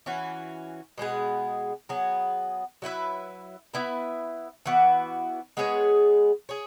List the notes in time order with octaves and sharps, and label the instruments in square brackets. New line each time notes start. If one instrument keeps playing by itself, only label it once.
[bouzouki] E3 C#4 F#4
B2 G#3 B3 G#4
F#3 B3 G#4
F#3 E4 B4 E5
B3 E4 B4 E5
E3 B3 F#4
G#3 B3 G#4 C#5
G#4 C#5